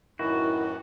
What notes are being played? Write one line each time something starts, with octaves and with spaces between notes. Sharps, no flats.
F#2 A2 D#3 E3 E4 F#4